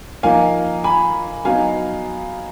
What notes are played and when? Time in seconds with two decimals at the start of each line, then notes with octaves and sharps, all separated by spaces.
0.23 F3 A#3 D#4 F5 G#5
0.84 G#5 B5
1.45 F#3 B3 D#4 F5 G#5